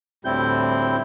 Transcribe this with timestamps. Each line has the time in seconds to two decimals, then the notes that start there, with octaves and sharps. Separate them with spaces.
0.25 D2 A2 G3 C4 E4 G6